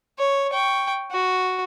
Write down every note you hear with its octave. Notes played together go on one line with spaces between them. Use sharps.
C#5
G5 C#6
F#4